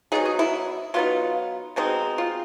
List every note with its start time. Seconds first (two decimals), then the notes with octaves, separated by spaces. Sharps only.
0.12 F#3 B3 D#4 G#4
0.25 G#4
0.39 E4
0.94 F#3 B3 D#4 F4
1.76 B2 G#3 C4 D#4
2.18 F4